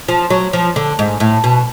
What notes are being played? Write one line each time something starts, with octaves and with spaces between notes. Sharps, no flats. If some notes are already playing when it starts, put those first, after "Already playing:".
F3
F#3
F3
D3
G#2
A2
B2